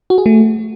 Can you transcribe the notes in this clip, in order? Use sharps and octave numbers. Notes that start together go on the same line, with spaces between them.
F#4
G#4
A3